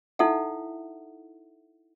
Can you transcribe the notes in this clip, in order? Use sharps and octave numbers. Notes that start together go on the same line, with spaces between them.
D#4 E4 A4 E5 F#5